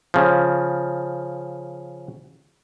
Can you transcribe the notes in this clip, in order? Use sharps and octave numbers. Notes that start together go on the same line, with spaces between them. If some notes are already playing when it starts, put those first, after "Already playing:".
C#3 F3